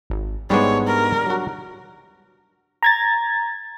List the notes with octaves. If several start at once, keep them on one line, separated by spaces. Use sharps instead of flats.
G#1
G#2 G3 G#3 B3 D4 C#5
A#4
F#3 F#4
A#5 G#6 A6